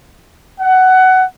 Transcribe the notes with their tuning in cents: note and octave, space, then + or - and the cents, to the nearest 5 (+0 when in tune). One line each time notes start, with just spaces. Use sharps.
F#5 +15